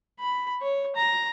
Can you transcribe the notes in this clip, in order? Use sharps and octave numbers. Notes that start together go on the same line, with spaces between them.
B5
C#5
A#5